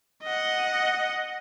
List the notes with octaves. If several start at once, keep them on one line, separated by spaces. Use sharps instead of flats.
D#5 F#5